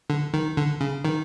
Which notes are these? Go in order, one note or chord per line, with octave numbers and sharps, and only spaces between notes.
D3
D#3
D3
C#3
D#3